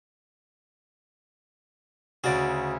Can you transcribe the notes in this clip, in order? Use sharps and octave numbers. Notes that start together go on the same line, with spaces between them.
D2 C#3 F#4 D5